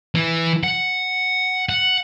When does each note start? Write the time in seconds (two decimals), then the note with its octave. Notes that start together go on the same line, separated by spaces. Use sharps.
0.15 E3
0.64 F#5
1.69 F#5